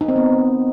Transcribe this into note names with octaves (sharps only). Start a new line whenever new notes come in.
D#4
C4
B3